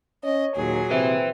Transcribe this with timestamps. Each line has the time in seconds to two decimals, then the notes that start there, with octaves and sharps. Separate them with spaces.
0.24 C#4 C#5 D#5
0.56 D#2 A#2 F#3 G#4
0.91 C3 C4 B4 E5